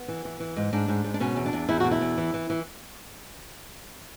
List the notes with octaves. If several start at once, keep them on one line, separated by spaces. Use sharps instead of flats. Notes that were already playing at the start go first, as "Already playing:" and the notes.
Already playing: B3
E3
E3
E3
G#2
G#2 D4
G#2
G#2
D4
B2 C#4
E2
D4
E2
E2 E4
B2 F#4
E4
E2
E3
E3
E3